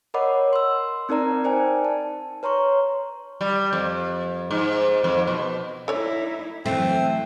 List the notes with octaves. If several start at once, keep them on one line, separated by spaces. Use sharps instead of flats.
A#4 C#5 D#5 F#5 B5 D6
C6 E6
C4 D#4 A#4 D5 A#5
D#4 C5 D5 G5 G#5
A5
B4 C#5 A#5 C6 C#6
G3
F2
G#2
F2
B2
D#4 E4 A4 C#5 D5
F#2 E3 A3 C4